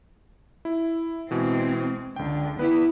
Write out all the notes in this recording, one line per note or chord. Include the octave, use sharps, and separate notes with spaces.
E4
B2 E3 G#3 C4
C#2 D3 G5
B3 E4 B4